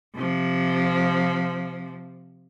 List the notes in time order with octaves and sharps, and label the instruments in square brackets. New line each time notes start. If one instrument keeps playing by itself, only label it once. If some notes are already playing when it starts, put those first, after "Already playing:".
[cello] C3 F3